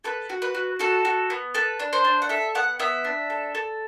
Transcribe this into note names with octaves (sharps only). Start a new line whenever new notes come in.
A4 B4
F#4
B4
F#4
F#4 A4
F#4
B3
A4 B4
D4
C5
D4
F#5
A4 E5
B3 F#5
B3 E5
D4
A4
A4